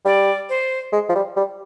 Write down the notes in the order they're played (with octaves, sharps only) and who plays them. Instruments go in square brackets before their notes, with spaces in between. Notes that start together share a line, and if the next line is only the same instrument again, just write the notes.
[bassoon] G3 [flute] D5
[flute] C5
[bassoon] G#3
F3
G3
G3